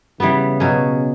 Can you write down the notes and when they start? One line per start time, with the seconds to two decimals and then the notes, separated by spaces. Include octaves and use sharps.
0.20 C#3 E3 G3 B3
0.60 B2 F#3 C#4